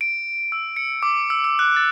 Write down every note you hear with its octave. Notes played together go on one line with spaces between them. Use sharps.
D7
E6
C#7
D6
E6
E6
F#6
A6